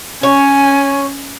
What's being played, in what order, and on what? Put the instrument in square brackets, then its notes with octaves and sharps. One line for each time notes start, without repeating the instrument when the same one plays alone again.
[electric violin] C#4 [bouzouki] C#5 [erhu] G#5